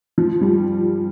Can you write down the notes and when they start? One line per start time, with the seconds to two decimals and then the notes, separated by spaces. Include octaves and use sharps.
0.18 F3
0.41 G3